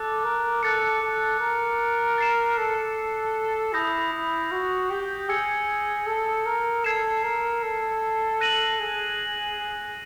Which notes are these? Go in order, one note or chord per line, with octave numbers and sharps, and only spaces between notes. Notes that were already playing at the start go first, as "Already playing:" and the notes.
Already playing: A4 D6 F#6 A6
A#4
A4 F#6 A6 C#7
A4
A#4
A6 C7 E7
A4
E4 D#6 G6 A#6
E4
F#4
G4
G#4 E6 G#6 C#7
A4
A#4
A4 G#6 C7 E7
A#4
A4
F#6 A#6 D#7 F#7
G#4